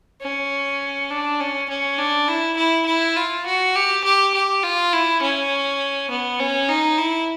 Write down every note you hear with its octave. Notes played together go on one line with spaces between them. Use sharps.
C#4
D4
C#4
C#4
D4
E4
E4
E4
F4
F#4
G4
G4
G4
F4
E4
C#4
B3
C#4
D#4
E4